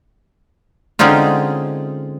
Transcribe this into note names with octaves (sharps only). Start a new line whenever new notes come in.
D3 G#3 C4 C#4 D#4 F4